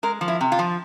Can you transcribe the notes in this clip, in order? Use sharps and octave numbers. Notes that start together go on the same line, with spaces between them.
G#3 A#4
F3
E4
C3
F4
F3